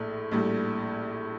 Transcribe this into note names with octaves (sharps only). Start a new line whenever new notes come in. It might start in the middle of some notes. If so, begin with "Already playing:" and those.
Already playing: A#1 A2
A#1 A2 G3